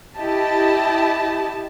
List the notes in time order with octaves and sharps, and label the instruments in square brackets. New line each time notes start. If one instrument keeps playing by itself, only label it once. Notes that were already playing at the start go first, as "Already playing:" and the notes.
[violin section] E4 G4 D#5 A5